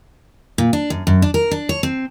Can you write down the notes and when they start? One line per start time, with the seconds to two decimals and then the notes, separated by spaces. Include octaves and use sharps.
0.58 A#2
0.73 D4
0.90 F#2
1.07 F#2
1.22 D4
1.34 A#4
1.51 D4
1.69 C#5
1.83 C4